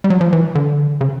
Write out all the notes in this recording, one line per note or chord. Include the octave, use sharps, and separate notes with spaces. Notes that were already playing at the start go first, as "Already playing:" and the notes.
G3
F#3
F3
E3
D3
C#3